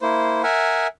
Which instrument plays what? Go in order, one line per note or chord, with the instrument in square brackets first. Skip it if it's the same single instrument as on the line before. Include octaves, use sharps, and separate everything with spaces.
[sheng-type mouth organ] A#3 E4 C5
A#4 E5 F#5 G#5